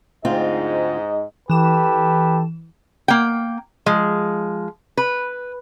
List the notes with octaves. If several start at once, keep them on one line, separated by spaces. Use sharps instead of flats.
D2 G#2 C4 F4 D#5
E3 G4 A4 B4 E7
A#3 G5
F3 G#3
B4